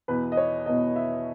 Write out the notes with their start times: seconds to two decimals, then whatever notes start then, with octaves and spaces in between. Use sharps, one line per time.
0.08 E2 B2 B4
0.32 D#5
0.37 C#5
0.66 E2 B2 D#5
0.96 E5